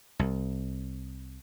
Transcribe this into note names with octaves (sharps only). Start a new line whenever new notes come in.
C2